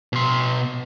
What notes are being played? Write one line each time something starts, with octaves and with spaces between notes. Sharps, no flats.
B2 C6